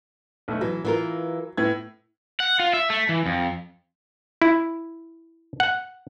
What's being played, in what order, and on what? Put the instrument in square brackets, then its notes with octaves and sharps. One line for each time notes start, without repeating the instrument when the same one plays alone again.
[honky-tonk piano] B1 A3
[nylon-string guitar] E3 [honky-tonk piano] F#3
[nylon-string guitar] E3 F4 A#4
[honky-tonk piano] A2 B3 G#6
[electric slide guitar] F#5
F4
E5
A3
E3
F2
[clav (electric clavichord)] E4
F#5